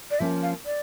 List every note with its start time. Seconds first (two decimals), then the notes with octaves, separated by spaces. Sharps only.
0.11 D5
0.19 F3 A#3 C#4 E5
0.43 F5
0.66 D5